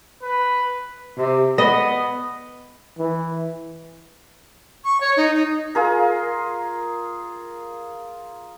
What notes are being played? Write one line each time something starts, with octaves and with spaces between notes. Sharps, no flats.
B4
C3
B3 D#5
E3
C#6
C#5
D#4
D#4
F4 G#4 A#4